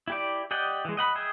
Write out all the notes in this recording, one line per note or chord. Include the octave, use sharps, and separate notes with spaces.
E4 G4 D5
G4 D5 D#5 F#5 G5
E3 G#3
D#5 F#5 B5
G#4 D#5 E5 G5